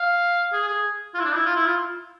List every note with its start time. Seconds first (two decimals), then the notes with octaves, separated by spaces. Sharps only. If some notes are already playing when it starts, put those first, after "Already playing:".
Already playing: F5
0.52 G#4
0.68 G#4
1.14 F4
1.20 E4
1.24 D4
1.35 E4
1.46 F4
1.56 E4
1.66 F4